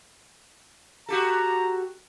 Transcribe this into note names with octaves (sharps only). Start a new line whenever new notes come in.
F#4 G4 A4 A#5